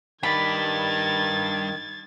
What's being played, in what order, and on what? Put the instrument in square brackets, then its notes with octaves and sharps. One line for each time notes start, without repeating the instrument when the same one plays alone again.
[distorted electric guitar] G2 D5 [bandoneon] D#3 [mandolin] B5 [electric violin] G#6 A6